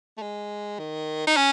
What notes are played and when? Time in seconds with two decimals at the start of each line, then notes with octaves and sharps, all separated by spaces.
0.17 A3
0.22 G#3
0.79 D#3
1.27 D#4
1.36 C#4